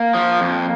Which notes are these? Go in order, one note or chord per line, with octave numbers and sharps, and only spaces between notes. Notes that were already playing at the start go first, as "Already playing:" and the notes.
Already playing: A#3
F3
F2